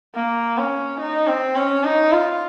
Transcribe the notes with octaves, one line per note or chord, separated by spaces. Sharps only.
A#3
C#4
D#4
C4
C#4
D#4
F4